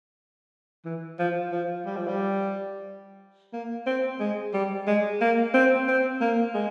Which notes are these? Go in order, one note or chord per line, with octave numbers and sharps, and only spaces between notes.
E3
F3
F3
G3
F3
G3
A#3
C4
G#3
G3
G#3
A#3
C4
C4
A#3
G#3